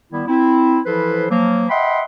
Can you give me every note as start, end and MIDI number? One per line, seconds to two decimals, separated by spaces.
0.12 0.23 51
0.12 0.23 55
0.12 0.23 59
0.12 0.23 64
0.27 0.80 60
0.27 0.80 64
0.85 1.26 52
0.85 1.26 53
0.85 1.26 64
0.85 1.26 69
0.85 1.26 71
0.85 1.26 72
1.29 1.64 53
1.29 1.64 54
1.29 1.64 58
1.69 2.02 75
1.69 2.02 76
1.69 2.02 78
1.69 2.02 79
1.69 2.02 83
1.69 2.02 84